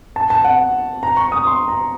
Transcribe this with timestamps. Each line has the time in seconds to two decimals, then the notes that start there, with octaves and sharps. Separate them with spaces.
0.16 A5
0.30 A5
0.45 F#5
1.03 A#5
1.17 C#6
1.32 D#6
1.47 C6
1.68 A#5